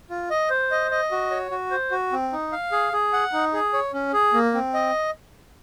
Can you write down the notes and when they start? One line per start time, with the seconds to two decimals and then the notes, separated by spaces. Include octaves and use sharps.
0.10 F4
0.30 D#5
0.50 C5
0.71 D#5
0.91 D#5
1.11 F#4
1.31 C#5
1.51 F#4
1.71 C5
1.91 F#4
2.12 C4
2.32 D#4
2.52 F5
2.72 G#4
2.93 G#4
3.13 F#5
3.33 D#4
3.53 G#4
3.73 C#5
3.93 C#4
4.13 G#4
4.34 A#3
4.54 C4
4.74 D#5